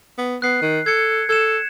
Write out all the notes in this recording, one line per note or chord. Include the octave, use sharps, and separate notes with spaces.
B3
B3 F#6 C7
D#3
A4 G#6 C#7
A4 G#6 E7